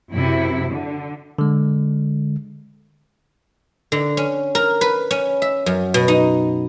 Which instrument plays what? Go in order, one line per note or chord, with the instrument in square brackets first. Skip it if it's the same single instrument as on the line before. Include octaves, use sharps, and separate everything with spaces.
[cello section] F#2 C3 E4
D3
[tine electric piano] D3 G#3
[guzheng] D3
C#4
A#4
B4
C#4
E5
F#2
B2
D#4